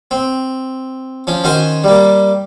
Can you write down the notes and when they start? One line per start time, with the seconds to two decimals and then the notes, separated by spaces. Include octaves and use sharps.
0.11 C4
1.27 F3 C#4
1.44 D#3 C#4 F#4 C5 G#5
1.84 G3 A#3